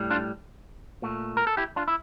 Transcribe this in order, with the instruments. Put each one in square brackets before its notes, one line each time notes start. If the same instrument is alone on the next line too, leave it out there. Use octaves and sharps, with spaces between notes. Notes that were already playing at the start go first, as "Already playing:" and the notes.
Already playing: [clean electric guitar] A2 G3
D4 F4
A#2 A3
A#4
A4
E4 G4
D4 F4
E4